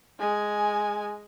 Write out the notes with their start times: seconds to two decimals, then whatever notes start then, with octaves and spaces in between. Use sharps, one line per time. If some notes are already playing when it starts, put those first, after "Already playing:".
0.19 G#3 G#5